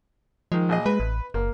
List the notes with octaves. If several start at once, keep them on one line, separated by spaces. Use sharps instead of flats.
D#3 F3 G#3
A#1 G#4 D#5
G#3 B4
A1
F#1 A#3